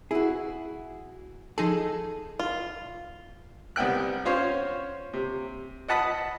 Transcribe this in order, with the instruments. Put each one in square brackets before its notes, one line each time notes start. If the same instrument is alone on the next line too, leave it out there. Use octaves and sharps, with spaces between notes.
[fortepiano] E4 [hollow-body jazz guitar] F#4 G#4
[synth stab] F3 D#4 G#4 [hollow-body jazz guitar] A4
[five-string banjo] F4
[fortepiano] C2 B3 G5 F#6
C#4 F4 C5 C#5
C3
D#5 F#5 A5 B5 D#6